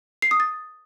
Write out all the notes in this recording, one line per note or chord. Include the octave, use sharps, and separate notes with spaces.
C7
D#6
A6